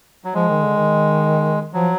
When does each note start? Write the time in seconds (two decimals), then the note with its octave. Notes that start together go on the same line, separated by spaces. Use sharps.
0.25 F#3
0.34 F3 G#3
0.49 D#3
0.63 D3
0.76 D#3
1.73 F3 F#3